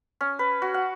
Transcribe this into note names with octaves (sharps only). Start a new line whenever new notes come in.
C#4
B4
F#4
F#5